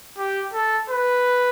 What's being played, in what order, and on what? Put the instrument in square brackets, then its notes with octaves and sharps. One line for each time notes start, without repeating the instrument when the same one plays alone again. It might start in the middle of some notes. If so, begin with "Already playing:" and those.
[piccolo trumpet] G4
A4
B4